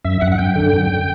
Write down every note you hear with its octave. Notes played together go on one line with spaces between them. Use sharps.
F#2 E5
F#2 F#5
F#5
F#2 G5
D3
F#2